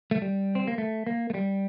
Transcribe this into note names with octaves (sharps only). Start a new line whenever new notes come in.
A3
G3
C4
A#3
A3
A#3
A3
G3